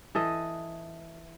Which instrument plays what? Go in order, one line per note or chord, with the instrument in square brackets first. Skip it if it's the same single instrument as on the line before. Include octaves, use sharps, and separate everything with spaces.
[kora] E3 A4 D#5